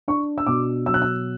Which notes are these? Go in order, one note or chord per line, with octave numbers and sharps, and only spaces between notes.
D4 C#6
E6
B2 D6
F#3 E6
F#6
E6